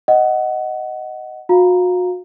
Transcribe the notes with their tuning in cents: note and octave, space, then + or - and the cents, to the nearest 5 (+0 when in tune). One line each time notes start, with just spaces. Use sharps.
D#5 +0 F#5 +15
F#4 -35 F5 +0 A#5 +0